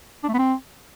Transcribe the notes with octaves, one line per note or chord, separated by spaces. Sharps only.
D4
A3
B3
C4